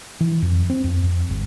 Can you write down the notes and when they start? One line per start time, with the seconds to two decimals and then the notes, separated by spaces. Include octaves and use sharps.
0.21 E3
0.42 F2
0.70 C4
0.84 F2
1.03 F2
1.30 G1